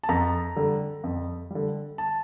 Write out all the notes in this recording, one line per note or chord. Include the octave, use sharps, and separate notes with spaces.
A5
F2 A#5
D3 G3
F2
D3 G3
A5